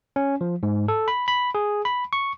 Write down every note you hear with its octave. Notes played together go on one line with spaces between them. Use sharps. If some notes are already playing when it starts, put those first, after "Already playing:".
C#4
F3
G#2
A4
B5
B5
G#4
B5
C#6